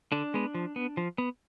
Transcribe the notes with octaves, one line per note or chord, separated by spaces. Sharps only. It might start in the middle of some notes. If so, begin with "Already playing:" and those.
D3 D4
G#3 B3
F3
B3
F3
B3